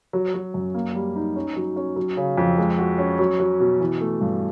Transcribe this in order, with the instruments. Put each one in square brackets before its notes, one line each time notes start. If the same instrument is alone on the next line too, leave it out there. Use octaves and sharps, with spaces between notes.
[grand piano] F#3
F#3
F#2
A#3
G3
D#4
C#4
F#3
C#4
F#3
C#3
F2
G#3
F#4
C#4
F#3
F#3
B2
E3
A3
G2